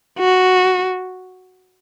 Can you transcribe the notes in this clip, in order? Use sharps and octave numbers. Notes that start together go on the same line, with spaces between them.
F#4